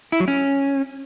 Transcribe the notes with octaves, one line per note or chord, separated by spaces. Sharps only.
E4
F#3
C#4